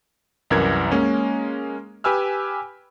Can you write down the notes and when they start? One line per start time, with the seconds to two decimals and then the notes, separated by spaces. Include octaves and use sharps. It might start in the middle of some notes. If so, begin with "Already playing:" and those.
0.50 C2 F#2 E3 A#4 G#6
0.92 G#3 A#3 C#4
2.04 G4 B4 G#5 E6 F6